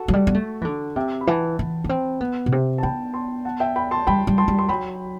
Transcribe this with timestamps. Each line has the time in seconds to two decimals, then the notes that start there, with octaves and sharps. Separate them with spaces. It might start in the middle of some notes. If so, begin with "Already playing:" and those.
Already playing: F#4 A4
0.08 F#3
0.13 G3
0.27 B3
0.34 A3
0.61 E3
0.65 D3
0.96 C3 E5 G5
1.21 B5
1.27 E3 F#5 A5
1.59 E3
1.84 B3
1.89 C4
2.21 B3
2.46 B2
2.52 C3
2.78 A5
2.83 B3 G5 B5
3.14 A5 C6
3.45 F#5 A5
3.60 E5 G5
3.76 G5 B5
3.91 A5 C6
4.07 G3 G5 B5
4.27 G3
4.38 A5 C6
4.48 G3
4.59 C6
4.69 F#3 G5 B5